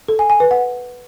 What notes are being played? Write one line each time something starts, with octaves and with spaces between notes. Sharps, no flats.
A4
G#5
G#5
B4
F#5